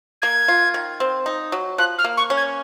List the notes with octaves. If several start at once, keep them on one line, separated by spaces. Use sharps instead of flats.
A#3 G#6
F4
D#3
C4
D#4
F#3
F3 F#6
F6
A#3
C#6
C#4
G#6